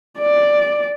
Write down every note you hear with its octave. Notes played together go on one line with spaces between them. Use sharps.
D5